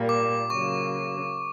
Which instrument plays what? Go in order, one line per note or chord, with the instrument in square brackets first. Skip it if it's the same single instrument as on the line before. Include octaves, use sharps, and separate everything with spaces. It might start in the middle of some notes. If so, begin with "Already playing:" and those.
Already playing: [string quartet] A#2 G3 A#3
[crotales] D6
[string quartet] C#3 F#3 A#3 [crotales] C#6